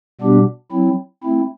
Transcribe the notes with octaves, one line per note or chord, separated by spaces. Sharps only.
B2 G3 B3 D4 G4
F#3 C4 E4
A3 C4 E4